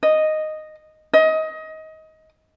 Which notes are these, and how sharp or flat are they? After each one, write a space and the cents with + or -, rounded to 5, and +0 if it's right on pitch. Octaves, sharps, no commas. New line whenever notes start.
D#5 -5
D#5 +20